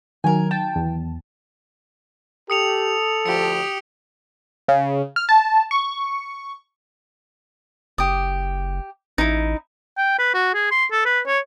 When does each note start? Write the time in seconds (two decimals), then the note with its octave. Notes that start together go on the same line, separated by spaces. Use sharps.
0.24 D#3 F#3 A#4 G#5
0.51 G5 A5
0.76 E2
2.50 G4 A4 D#6 C#7 F7
3.26 D2 F3 G4 C#7
4.68 C#3
5.16 F6
5.29 A5
5.71 C#6
7.98 F#1 G4 D#6
9.18 A1 D#4 E4
9.97 G5
10.19 B4
10.34 F#4
10.54 G#4
10.71 C6
10.92 A4
11.05 B4
11.27 C#5